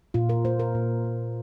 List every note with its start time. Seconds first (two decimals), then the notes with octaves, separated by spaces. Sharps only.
0.14 A#2 F4
0.29 A#4
0.45 A#3 C5
0.59 A#4
0.75 A#2
1.04 A#3